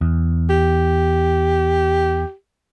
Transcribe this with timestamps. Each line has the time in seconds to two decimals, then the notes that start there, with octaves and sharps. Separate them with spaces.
0.01 E2
0.50 G4